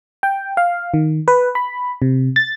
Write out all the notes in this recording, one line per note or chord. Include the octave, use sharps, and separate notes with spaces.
G5
F5
D#3
B4
B5
C3
A6